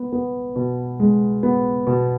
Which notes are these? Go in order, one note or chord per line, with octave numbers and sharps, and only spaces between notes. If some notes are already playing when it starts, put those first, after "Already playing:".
Already playing: B3
B3
B2
G#3
B3
B2